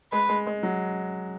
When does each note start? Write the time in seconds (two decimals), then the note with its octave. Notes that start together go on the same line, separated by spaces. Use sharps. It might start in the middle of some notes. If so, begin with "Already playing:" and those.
0.12 G#3 B4
0.29 G#3
0.47 G#3
0.63 F#3